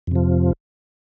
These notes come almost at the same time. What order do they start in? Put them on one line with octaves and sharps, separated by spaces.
F2 C3 F3